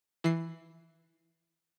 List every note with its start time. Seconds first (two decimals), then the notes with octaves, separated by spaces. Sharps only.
0.24 E3 C7